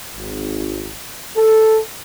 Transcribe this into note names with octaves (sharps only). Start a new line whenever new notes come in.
G#1
A4